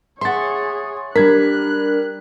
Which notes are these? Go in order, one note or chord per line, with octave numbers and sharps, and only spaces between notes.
G#4 C#5 E5 F#5 C6 A6
G3 D4 A#4 F#6 G#6 B6